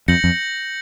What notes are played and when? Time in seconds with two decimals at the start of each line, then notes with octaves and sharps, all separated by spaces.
0.08 F2 G6 A#6 C#7 F#7
0.24 F2